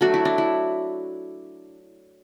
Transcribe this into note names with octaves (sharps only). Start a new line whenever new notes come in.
F#3 A3 D4 F#4
E4
D4
E4